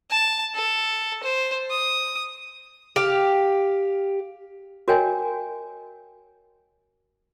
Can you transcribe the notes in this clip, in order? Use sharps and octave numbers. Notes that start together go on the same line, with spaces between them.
A5
A4
C5
D#6
G4 F5
F#4 A#4 C#5 D#5 G5 G#5